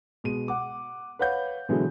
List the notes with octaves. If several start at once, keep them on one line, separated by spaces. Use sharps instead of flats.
B2 G#3 D#7
F#5 D6
B4 C#5 F5 F#5 G6
B2 D3 E3 F#3 G#3